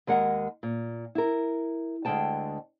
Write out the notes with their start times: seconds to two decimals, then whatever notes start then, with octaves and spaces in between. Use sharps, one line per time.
0.07 D#2 G#3 A#4 F#5
0.63 A#2
1.15 E4 A#4
2.05 D2 D3 E3 G#3 G5 A5